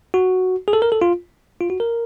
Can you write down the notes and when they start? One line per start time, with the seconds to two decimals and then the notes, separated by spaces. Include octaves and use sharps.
0.14 F#4
0.68 G#4
0.73 A4
0.82 A#4
0.92 A4
1.02 F4
1.61 F4
1.70 F#4
1.80 A#4